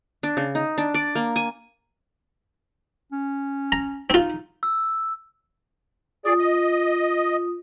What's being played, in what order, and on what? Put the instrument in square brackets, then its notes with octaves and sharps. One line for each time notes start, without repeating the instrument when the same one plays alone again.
[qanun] D4
C#3
D#4
D4
D5
A#3
G#5
[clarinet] C#4
[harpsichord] A#5
[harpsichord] C4 F4 [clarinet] D#4
[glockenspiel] E6
[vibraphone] F4 D#6 [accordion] G#4 D5
[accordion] D#5